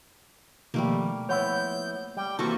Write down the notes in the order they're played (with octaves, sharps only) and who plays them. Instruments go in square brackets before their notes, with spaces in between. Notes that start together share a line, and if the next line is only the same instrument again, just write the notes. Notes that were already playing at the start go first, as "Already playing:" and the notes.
[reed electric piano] B2 D#3 F3 [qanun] G3 A3 A#3
[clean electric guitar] F3 B3 E4 [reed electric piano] C#5 F#5 [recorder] G6
[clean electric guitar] G3 [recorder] G5
[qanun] C3 A#3 F#4 [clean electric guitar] E3 F4 A4 [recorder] C#6